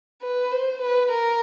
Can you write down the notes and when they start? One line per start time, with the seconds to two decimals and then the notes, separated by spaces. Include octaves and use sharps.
0.22 B4
0.52 C5
0.81 B4
1.11 A#4